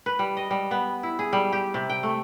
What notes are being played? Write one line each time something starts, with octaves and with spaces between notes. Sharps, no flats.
B4
G3
D#5
G3
B3
E4
G#4
G3
G4
C3
G5
A3